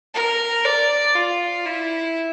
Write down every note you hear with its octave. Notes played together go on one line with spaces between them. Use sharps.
A#4
D5
F4
E4